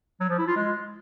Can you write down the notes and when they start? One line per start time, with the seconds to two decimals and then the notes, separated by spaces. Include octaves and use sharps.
0.21 F#3
0.30 F3
0.38 E4
0.47 F4
0.56 G#3